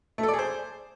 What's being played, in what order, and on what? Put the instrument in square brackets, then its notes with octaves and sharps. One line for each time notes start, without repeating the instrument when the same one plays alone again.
[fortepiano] A3
A4
D5
G#4
C5